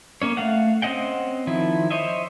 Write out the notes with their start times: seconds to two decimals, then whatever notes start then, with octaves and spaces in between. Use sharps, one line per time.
0.22 A#3 C#4 C#5
0.37 A3 F5 F#5
0.82 C4 C#4 D#5 F#5 G5
1.47 D#3 F3 E4
1.90 C5 C#5 D#5 E5